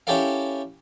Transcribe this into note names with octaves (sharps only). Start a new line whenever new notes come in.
C#4 E4 G4 A4 A#4 F5